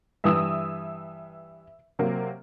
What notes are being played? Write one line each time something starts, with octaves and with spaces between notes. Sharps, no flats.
G2 E3 E5 D#6 E6
C3 F#3 A#3